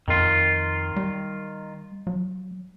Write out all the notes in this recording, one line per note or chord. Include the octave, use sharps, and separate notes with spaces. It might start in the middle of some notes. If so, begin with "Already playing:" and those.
F2 D#3 F4
G3
F#3